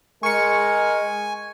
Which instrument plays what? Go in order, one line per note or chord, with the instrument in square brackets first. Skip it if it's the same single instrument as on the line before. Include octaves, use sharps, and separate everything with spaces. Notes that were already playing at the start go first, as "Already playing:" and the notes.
[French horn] G#3 [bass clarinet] A#4 [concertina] G#5 [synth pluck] C#6 C#7